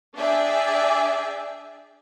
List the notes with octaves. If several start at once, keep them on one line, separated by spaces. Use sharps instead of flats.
D4 G#4 D5 E5 G5 G#5